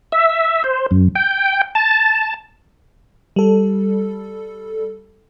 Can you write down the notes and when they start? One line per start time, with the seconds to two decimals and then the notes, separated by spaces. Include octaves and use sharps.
0.12 E5
0.64 C5
0.91 F#2
1.15 G5
1.75 A5
3.36 G3 A4